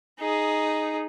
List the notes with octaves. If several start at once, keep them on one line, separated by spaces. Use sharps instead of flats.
D#4 G#4